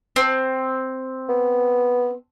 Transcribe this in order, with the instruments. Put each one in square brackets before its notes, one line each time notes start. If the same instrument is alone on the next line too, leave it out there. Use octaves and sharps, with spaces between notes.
[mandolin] C4
[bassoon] B3